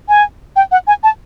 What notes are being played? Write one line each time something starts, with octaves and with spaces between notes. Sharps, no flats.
G#5
G5
F#5
G#5
A5